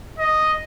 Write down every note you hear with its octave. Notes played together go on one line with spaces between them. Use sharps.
D#5